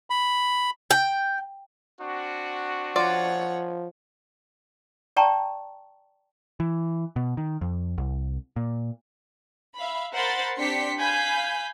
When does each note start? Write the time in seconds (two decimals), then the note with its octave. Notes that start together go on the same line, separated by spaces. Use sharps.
0.10 B5
0.91 G5
2.00 C4 D4 F#4
2.96 F3 F4 C#5 D5 F#5
5.16 D5 G5 A5 A#5 C#6
6.60 E3
7.16 B2
7.37 D#3
7.61 F2
7.98 C2
8.56 A#2
9.76 E5 F5 B5
10.13 A#4 C5 F#5 B5 C6 A6
10.58 C4 D4 G4 C6 B6 C#7
10.99 F5 G#5 B5 G6 B6